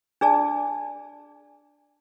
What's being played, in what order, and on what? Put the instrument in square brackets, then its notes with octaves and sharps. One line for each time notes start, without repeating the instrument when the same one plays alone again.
[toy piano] D4 G#4 D5 A5